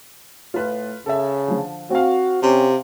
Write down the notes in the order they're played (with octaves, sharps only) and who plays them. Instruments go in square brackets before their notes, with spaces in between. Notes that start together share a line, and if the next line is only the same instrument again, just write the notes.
[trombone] A2 [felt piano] F4 B4 F5
[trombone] C#3 [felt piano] A4 E5
[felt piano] D3 F3
[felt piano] C4 F5 [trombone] F#4
[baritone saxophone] C3 [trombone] C#4